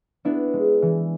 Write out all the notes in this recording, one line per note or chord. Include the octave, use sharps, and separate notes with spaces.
B3 D4 E4
G#3
E3